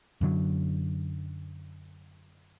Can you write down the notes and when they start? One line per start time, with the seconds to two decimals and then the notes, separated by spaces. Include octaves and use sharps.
0.21 F#2 D3 F#3